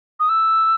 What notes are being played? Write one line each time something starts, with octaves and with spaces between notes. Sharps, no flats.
D#6
E6